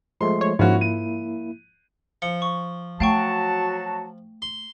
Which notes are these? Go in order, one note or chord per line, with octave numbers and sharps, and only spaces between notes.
F3 G#3 A3 C6
C#5
G#2 F3 A#3 C#4 E4 F#4
D#7
F3 C#7
C#6
F#3 A3 F#4 F5 G5 A5 C#6
C6